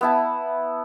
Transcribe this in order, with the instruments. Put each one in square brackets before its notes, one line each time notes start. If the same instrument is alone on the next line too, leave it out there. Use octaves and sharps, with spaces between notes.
[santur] B3 E4 A5